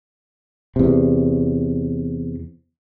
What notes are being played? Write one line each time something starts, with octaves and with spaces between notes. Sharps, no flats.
E2 C3